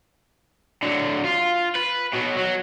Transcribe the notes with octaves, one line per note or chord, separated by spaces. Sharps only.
D3 F#3
F4
B4
B2 F#3
F#3